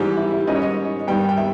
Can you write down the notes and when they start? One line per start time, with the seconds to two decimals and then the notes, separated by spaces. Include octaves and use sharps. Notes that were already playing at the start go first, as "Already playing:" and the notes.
Already playing: G#2 E3 G3 G4
0.17 E4
0.33 E4
0.47 G#2 G3 C#4 D#5
0.55 C#5
0.62 D#5
1.07 G2 D#3 G3 B3 G5
1.29 G5
1.37 E5